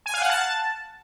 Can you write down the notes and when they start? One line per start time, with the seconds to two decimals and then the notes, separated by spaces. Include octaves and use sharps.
0.06 G#5
0.14 F5
0.22 F#5
0.30 A5